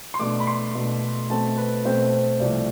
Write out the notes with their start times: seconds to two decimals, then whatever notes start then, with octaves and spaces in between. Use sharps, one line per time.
0.14 C6
0.19 B2 A3 D4 D6
0.40 B5
0.47 C6
0.74 B2 A3 D4
1.30 B2 A3 C4 A5
1.57 B4
1.85 B2 A3 C4 C5
2.40 C2 C3 F3 A3 D5